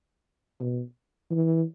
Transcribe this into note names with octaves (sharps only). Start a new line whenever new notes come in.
B2
E3